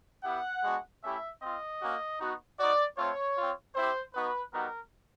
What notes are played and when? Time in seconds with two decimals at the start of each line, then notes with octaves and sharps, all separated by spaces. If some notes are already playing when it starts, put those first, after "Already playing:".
0.24 B3 E4 G4 F#5
0.63 G#3 B3 D4 F#4
1.02 A3 C#4 E4 G4 E5
1.40 C4 F4 D#5
1.80 A#3 C#4 F#4
2.20 B3 D#4 F#4
2.58 B3 D#4 F#4 D5
2.97 A3 C4 F4 C#5
3.36 C4 F4
3.74 C4 E4 G4 C5
4.14 B3 D#4 F#4 B4
4.52 G3 B3 D#4 F#4 A#4